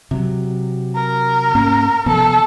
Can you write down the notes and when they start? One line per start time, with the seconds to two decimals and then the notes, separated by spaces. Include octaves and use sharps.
0.11 C3 F#3
0.95 A#4
1.55 G#2 A#3 C#4
2.06 C3 F3 B3 A4